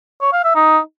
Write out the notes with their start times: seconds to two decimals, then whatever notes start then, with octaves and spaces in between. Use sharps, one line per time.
0.21 C#5
0.33 F5
0.44 E5
0.55 D#4